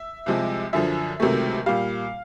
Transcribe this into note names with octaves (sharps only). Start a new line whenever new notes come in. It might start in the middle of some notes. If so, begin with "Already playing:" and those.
Already playing: E5
C2 C3 F3 G#3
F#2 D3 F3 E5
C#2 C3 D#3 F#3 A3
A#2 G3 F5